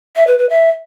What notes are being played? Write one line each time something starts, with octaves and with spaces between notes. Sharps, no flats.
E5
B4
B4
E5